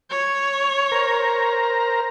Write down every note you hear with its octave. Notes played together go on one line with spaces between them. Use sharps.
C#5
A#4 C5 A#5